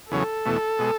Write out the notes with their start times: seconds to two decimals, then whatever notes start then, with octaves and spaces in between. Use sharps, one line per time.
0.11 E2 C#3 F#3 A4
0.46 E2 B2 A3
0.79 B2 G#3